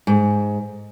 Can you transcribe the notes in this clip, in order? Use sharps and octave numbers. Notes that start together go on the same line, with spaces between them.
G#2